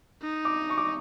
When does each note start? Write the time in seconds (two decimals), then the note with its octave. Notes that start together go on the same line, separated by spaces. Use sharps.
0.22 D#4
0.45 D6
0.70 C#6
0.78 D6